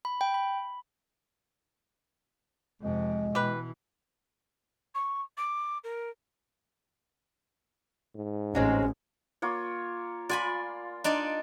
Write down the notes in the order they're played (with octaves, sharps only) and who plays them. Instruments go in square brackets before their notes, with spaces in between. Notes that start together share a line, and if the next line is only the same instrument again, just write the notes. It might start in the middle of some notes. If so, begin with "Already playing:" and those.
[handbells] B5
G5
B5
[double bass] F2 C3 [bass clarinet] G#3
[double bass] B2 E3 [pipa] G4 B4
[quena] C#6
D6
A#4
[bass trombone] G#2
[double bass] A1 [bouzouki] F#3 G#3 C4 [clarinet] C#4
[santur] A#3 F4 C#5
[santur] F4 C6 [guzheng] D5 G#5 B5
[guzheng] D4 D#4 D5